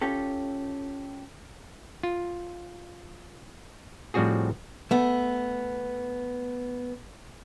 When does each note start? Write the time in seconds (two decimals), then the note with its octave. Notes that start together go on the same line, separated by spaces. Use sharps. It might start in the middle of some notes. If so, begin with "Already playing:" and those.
0.01 C#4 F4 G4 A4
2.03 F4
4.14 A2 F3 G3 C4 F#4 G#4
4.91 A3 B3